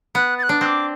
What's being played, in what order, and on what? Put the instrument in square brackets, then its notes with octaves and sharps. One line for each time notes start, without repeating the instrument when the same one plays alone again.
[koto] B3 [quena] F#6
[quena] A6
F#6
[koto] D4
[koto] C4 [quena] F#6
[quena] D6